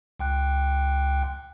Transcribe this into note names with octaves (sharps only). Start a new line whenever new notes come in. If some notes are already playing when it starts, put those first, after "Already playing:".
C#2 G5 F#6